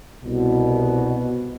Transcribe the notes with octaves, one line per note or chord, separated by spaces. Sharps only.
C2 B2